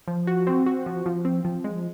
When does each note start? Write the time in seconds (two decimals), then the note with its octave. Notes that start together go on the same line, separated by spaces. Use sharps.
0.08 F3
0.27 F#4
0.47 C4
0.66 F#4
0.86 F3
1.06 F3
1.25 C4
1.45 F3
1.64 G#3